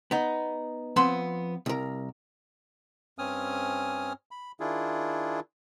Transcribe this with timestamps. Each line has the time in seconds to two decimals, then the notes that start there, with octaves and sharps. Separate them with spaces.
0.11 B3 D#4
0.96 F3 B3 C4 B4 B5 C6
1.66 C2 A#4
3.19 G2 C4 C#4 G#5 D#6 F6
4.31 B5
4.60 D#3 D4 E4 F4 G#4